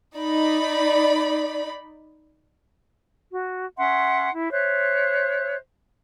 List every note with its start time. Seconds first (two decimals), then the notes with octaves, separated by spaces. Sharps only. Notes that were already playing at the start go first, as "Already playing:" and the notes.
0.16 D#4 D5 B5
3.31 F#4
3.78 C#4 E5 F#5 C6
4.32 E4
4.51 C5 C#5 E5 F#6